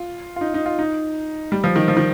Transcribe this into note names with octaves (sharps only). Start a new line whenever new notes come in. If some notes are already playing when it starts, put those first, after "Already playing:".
Already playing: F4
F4
D#4
D#4
F4
D#4
G3
F3
D#3
F3
D#3